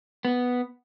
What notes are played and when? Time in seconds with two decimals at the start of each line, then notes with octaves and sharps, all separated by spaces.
0.25 B3